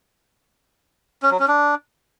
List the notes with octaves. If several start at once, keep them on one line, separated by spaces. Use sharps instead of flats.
C#4
F#3
C#4
D4